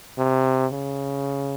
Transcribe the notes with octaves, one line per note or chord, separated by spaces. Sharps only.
C3
C#3